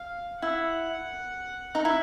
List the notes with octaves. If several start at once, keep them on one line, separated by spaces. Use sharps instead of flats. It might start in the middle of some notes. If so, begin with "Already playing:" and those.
Already playing: F5
E4 F#5
D#4
E4